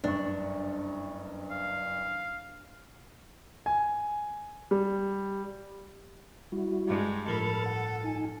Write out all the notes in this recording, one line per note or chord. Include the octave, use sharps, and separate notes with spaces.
F#1 G2 D4 C#6
F5
G#5
G3
G3 E4 F#4
G2 G#3
A2 F3 A4 A#4 B5 F6
F#5
D#4 G#5